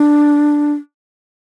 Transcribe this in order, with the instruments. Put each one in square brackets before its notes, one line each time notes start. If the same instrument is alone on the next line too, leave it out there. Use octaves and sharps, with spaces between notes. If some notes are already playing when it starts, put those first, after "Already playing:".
Already playing: [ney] D4